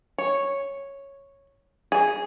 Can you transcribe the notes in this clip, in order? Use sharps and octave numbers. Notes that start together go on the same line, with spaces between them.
C#5
G#4